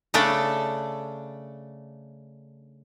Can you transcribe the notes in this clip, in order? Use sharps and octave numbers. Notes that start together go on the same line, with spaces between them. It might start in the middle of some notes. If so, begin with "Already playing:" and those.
C#3 A3 D4 A4